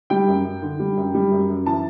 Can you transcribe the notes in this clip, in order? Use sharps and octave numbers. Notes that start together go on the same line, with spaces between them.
G3 G5
F#2
F#2
D3
G3
F#2
G3
F#2
F#2
E3 A5